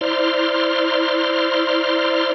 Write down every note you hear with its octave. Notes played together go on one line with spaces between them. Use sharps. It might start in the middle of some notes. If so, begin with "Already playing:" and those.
E4 C5 D5 A#5 C6 F6